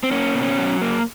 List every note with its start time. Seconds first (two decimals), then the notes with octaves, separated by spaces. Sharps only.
0.03 C4
0.11 A#3 C#4
0.35 B2
0.42 C#4
0.58 F#3
0.82 A#3